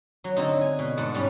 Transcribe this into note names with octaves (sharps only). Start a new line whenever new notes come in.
F#3
D3 C4 D#4
G#5
B2
G#2 F#5 A5
G3 B3 C#4